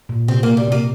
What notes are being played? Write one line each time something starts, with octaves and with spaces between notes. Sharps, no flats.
A#2
C3 C4
A#3
C3
G3
C3 A#3